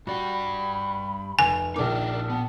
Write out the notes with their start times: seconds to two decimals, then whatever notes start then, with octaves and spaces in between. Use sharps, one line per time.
0.07 G2 F#4 D5 G5 B5
1.39 F1 G#5
1.76 A#1 A#2 D4 D#4 A#4 D6
2.30 B3 A5